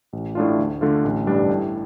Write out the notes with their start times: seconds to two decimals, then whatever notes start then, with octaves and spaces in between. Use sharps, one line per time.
0.13 A1
0.35 A2 A3 D4 F4
0.59 D2
0.81 D3 A3 D4 F4
1.04 A1
1.27 G2 G3 D4
1.49 A2